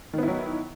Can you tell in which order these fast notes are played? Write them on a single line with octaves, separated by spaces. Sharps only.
D#3 B3 E4 F#3